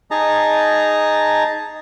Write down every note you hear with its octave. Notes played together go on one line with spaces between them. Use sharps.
D#4 G#4 A5 A#5